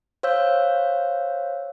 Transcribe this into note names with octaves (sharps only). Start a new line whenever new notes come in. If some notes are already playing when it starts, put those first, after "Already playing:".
C5 C#5 F5 E6 G6